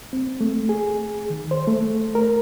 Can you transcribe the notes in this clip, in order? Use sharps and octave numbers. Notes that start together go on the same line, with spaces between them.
C4
A3
G#4
D#3
C5
A3
A#4